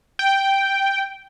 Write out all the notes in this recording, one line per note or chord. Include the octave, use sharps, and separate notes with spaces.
G5